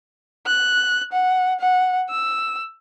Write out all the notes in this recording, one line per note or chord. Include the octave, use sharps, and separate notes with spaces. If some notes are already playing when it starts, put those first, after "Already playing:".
F#6
F#5
F#5
E6